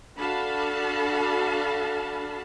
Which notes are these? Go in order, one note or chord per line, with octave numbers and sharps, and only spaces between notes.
D4 F#4 A4 F5 A5 B5